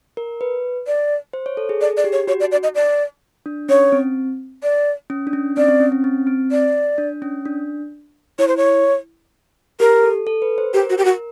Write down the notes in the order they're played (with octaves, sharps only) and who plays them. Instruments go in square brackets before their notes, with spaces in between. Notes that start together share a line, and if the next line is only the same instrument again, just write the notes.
[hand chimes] A#4
B4
[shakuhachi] D5
[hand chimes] C5
C#5
A4
G#4
[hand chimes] G#4 [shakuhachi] D5
[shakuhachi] D5
[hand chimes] G4
[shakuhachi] C#5
[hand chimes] F#4 [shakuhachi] C#5
[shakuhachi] D5
D5
D#5
D5
[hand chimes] D4
[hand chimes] C#4 [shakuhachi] C#5
[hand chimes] C4
[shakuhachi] D5
[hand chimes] C#4
D4
C#4
[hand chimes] C4 [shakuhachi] D5
[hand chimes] C4
C#4
C#4
C4
C4
[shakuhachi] D5
[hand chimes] D4
C#4
D4
[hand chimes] E4 [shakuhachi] C#5
[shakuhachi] C5
C#5
[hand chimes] G4 [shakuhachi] A#4
[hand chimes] A4
A4
B4
C5
[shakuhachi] G4 [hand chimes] A#4
[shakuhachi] F#4
G4
F#4